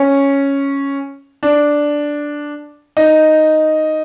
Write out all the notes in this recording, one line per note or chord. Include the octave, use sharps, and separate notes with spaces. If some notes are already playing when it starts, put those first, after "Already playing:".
Already playing: C#4
D4
D#4